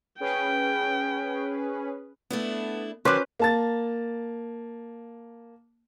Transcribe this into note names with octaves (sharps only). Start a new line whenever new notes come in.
C#4 G#4 B4 G5
A3 B3 D4 E4
D#3 F#3 C#4 B4 C5 C6 D6 F#6
A#3 A5 A6